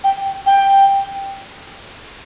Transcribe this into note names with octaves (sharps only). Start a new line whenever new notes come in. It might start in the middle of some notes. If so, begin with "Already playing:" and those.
G5
G5